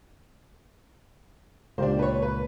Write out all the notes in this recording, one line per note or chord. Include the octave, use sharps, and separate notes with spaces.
C#2 A#2 A#3 D4 G4 C5
B4 C#5
B4